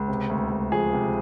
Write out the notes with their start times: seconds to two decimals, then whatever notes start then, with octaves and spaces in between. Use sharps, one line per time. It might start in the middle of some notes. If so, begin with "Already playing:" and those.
Already playing: C#2
0.08 C3
0.30 D2
0.51 D2
0.72 F3 G#4
0.93 C3